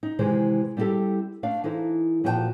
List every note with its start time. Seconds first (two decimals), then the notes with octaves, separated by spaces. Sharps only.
0.03 D#4
0.19 C3 D#3 E3 G#3 C5
0.77 G3 C4 E4 F4 G4 A4
1.43 A3 D4 F5
1.64 E3 D#4 A4 C5
2.24 A#2 F3 F#4 C5 G5 A5